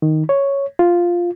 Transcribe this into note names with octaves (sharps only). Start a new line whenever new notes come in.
D#3
C#5
F4